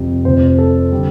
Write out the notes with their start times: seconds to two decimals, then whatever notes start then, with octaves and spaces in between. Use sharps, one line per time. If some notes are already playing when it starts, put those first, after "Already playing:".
Already playing: F2 C3 G3
0.25 F1 F2 C3 C5
0.58 A4
0.91 D3 G3